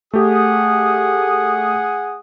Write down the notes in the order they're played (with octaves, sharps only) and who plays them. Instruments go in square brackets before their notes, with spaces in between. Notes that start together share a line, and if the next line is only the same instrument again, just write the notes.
[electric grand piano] A3 G4 [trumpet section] G#4 F#5 D#6